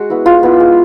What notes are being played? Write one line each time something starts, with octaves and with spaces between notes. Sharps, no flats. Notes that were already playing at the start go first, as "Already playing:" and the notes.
Already playing: G#3 F#4
B3 E4
G#3 F4
B3 E4
G#3